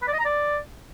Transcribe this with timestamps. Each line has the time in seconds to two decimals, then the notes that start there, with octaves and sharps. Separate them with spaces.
0.02 B4
0.08 D5
0.13 D#5
0.19 A#5
0.25 D5